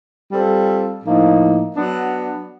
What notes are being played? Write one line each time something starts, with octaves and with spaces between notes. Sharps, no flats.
G3 C4 F4 A4
A2 F3 A#3 D#4
F#3 B3 D4